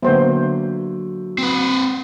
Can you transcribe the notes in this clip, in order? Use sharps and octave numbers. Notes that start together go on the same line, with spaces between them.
D3 F#3 A#3 B3 C5 E5
C4 B4